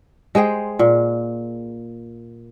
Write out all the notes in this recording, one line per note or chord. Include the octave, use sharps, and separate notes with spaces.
G#3 G#4 C5 G5
A#2